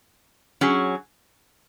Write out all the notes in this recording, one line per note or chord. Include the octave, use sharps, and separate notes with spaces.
F#3 C#4 G#4